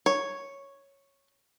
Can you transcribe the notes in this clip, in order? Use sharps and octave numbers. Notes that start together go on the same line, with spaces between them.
C#5